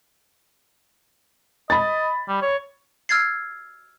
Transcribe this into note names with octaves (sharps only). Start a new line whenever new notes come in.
D#5 B5 A6
G3
C#5
E6 F6 G#6 A6 C7